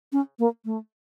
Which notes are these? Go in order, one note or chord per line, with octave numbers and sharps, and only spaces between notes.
C#4
A#3
A3